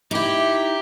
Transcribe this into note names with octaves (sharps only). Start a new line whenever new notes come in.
D#4 E4 G4